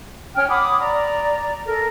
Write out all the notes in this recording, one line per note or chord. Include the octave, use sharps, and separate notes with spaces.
C#4 G5 F6
F#5 B5 D6 D#6
D5 A#5
A4 A#4